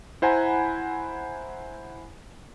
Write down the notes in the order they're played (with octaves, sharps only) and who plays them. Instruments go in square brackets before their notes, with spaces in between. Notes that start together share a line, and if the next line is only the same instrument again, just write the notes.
[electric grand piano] E4 C5 F#5 G#5 A#5 B5